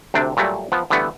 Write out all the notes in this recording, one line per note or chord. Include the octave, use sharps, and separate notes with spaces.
D2 C3 D4 G5
A#2 F#3 G3 A3
F3 B3
D3 E3 G3 A3 B3